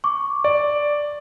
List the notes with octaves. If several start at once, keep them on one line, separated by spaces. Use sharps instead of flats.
C#6 D6
D5